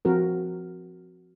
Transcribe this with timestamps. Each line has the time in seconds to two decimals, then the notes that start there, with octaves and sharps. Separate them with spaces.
0.05 F3 C4 F#4 A#4